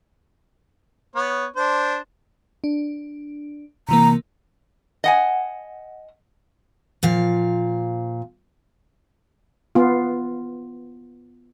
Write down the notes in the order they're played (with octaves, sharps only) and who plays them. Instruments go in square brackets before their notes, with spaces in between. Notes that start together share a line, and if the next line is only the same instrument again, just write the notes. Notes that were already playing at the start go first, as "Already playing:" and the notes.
[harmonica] B3 C#5
D4 C5
[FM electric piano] D4
[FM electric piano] C3 E3 A#3 [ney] A#5
[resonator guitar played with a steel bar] D#5 F#5 G#5
[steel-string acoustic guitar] A#2 F3 F5
[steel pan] B3 F4